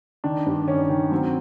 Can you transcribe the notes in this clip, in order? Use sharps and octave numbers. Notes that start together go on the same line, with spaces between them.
D#3 D4
G2
D#3 C#4
D#3
F#3 C4